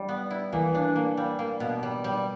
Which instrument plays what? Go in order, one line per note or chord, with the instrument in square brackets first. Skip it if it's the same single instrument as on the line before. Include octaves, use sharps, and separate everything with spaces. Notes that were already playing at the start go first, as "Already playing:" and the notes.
Already playing: [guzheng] G3 E4
B3
E4
[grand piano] E3 [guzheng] A#3
[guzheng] D4
A#3
G3
A#3
B2
G3
G3